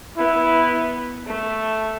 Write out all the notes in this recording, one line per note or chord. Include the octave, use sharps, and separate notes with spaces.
B3 E4
A3